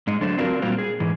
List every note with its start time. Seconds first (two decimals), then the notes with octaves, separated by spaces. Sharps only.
0.07 G#2 G#3 D#4
0.21 D3 F#3 A3 D4 C5
0.37 C4 D4 F4 F#4 G#4 A#4
0.62 A#2 G3 A#3 C4 F4 F#4
0.78 G#4
1.00 G#2 E3